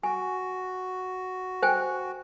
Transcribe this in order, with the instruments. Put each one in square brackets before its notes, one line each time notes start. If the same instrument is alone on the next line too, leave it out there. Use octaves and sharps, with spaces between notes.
[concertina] F#4 [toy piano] G#5
[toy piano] C5 G5 G#5